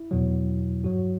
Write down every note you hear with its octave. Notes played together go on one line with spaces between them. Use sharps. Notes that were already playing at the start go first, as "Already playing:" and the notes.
Already playing: E4
E2 B2 F#3
G2 F#3 F#4